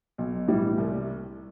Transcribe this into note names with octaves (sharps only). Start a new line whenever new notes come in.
B1
A2 E3 G3
C2